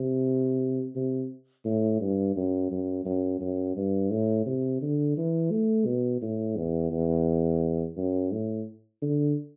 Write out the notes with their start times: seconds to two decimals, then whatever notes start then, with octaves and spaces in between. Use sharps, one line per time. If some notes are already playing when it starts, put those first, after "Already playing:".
Already playing: C3
0.95 C3
1.65 A2
2.01 G2
2.36 F#2
2.71 F#2
3.05 F#2
3.40 F#2
3.76 G2
4.10 A2
4.46 C3
4.82 D3
5.17 E3
5.51 A3
5.86 B2
6.22 A2
6.56 E2
6.91 E2
7.97 F#2
8.31 A2
9.02 D3